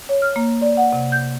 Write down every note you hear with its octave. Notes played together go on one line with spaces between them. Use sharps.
C#5
F6
A#3
D5
F#5
C3
G6